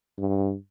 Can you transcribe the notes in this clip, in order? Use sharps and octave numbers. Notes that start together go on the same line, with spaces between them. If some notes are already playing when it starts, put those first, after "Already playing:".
G2